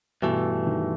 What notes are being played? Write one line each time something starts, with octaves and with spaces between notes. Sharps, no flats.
G2 B2 E3 A3
D#3